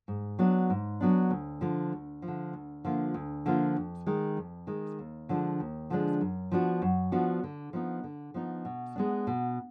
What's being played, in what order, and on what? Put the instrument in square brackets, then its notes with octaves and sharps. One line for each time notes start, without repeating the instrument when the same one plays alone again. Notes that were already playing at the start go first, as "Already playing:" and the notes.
[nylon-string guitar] G#2
F#3 B3 D4
G#2
F#3 B3 D4
D2
D3 F3
D2
F3
D3
D2
D3 F3 A#3 F4
D2
D3 F3 A#3 F4
F2
D#3 G#3
F2
D#3 G#3
D#2
D3 F3 G#3 D4
D#2
D3 F3 G#3 D4
F#2
F3 B3 D4 F#4
F#2
F3 B3 D4 F#4
D3
F3 B3 D#4
D3
F3 B3 D#4
B2
G#3 B3 D4
B2